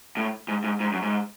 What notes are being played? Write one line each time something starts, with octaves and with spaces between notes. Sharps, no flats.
A2
G#2
G#2
G#2
F#2
G#2